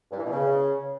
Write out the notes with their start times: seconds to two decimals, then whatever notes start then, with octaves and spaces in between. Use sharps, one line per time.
0.11 G2
0.18 E3
0.24 B2
0.30 C#3